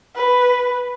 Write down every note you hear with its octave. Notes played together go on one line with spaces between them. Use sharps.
B4